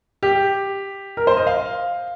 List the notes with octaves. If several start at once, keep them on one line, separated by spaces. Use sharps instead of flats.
G4
A#4
C5
D#5
F5